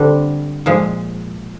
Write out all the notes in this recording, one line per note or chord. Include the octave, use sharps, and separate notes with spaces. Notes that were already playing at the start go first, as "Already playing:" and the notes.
Already playing: D3 G3 C4 D4
A#2 F3 G#3